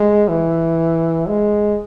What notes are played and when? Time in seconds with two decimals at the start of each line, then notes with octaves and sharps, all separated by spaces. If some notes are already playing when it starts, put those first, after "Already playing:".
Already playing: G#3
0.28 E3
1.28 G#3